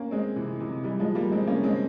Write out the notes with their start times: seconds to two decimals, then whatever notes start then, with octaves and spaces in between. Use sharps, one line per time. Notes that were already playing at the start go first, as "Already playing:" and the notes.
Already playing: A#3 C#4
0.11 G#3 C4
0.36 C3 E3
0.60 C3 E3
0.84 E3 G3
0.99 F3 G#3
1.15 G3 A#3
1.31 G#3 C4
1.47 A#3 C#4
1.63 G#3 C4